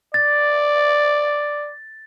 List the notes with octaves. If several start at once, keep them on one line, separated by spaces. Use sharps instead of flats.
D5 A6